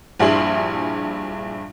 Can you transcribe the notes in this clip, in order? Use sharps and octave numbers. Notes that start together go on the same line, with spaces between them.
A#1 G2 E4 G#4 C6 F#7